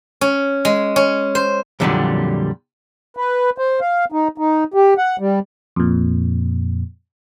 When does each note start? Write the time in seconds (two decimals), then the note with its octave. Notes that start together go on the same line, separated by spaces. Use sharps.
0.21 C#4
0.65 G#3
0.96 C#4
1.35 C5
1.80 F2 A#2 D3 D#3 F#3 G3
3.17 B4
3.58 C5
3.81 F5
4.12 D#4
4.38 D#4
4.74 G4
4.98 F#5
5.19 G3
5.76 F2 A#2